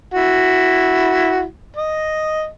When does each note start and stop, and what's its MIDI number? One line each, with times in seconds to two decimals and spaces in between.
0.14 1.44 64
0.14 1.44 66
1.76 2.48 75